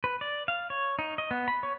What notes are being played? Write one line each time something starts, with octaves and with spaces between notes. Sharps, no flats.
B4
D5
F5
C#5
D#4
D#5
B3
B5
C#5